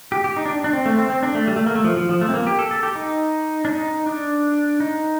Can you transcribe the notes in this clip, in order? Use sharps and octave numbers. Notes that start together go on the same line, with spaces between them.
G4
G4
D#4
D4
D4
C4
A3
C4
C4
D4
A3
G3
A3
A#3
A3
F3
F3
F3
A3
C4
A#3
G4
A4
A4
G4
D#4
D4
D#4
D4
D#4